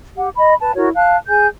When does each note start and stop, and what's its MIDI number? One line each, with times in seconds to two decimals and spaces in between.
0.17 0.29 67
0.17 0.29 78
0.37 0.55 75
0.37 0.55 83
0.61 0.72 71
0.61 0.72 81
0.75 0.90 64
0.75 0.90 66
0.75 0.90 70
0.75 0.90 73
0.96 1.17 77
0.96 1.17 81
0.96 1.17 90
1.28 1.47 68
1.28 1.47 80
1.28 1.47 91